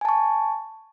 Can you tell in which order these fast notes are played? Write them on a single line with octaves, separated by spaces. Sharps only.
G#5 A5 C#6